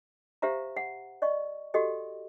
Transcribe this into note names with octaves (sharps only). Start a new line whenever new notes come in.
G4 C5 E5 F5 A#5
F#5
D5 D#5 C#6
F#4 G4 A4 D#5 G5